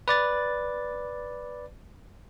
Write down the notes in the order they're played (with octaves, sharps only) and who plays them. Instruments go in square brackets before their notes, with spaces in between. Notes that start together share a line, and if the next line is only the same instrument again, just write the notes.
[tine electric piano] B4 D5 A6